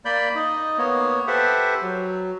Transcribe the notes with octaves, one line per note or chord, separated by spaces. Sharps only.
A#3 D5 B5 G6
D#4 D#5
A#3 B3 C#5
G4 A4 B4 C5 E5 F#5
F#3